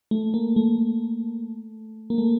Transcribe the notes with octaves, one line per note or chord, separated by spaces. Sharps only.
A3
A#3
A3
A#3
A3